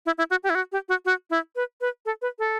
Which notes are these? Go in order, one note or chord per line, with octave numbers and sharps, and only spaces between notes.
E4
E4
F#4
G4
E4
F#4
G4
F#4
F#4
E4
B4
B4
A4
B4
A4